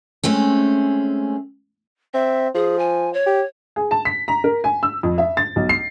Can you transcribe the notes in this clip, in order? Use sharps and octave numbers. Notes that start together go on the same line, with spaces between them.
G#3 A3 C4 C#4
C4 E5
F3 G#4
G#5
C#5
G4
G#4
A5
B6
A#5
A#4
G#5
E6
F2
E5
A6
B1
C7